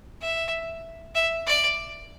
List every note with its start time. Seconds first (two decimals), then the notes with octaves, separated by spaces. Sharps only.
0.21 E5
1.15 E5
1.46 D5